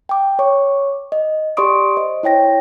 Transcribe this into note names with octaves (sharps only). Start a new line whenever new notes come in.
G5 D6
C#5 C#6 D6
D#5
G4 D5 C6 C#6 D#6 D7
C5 D#5
E4 C#5 G5 A#6